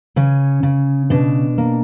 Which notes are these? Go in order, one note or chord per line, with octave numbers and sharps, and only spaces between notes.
C#3 C#4
C#3
B2 D4
A#3